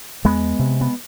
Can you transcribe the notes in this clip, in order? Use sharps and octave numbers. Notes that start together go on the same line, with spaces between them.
E2 G#3 B3
C3
B3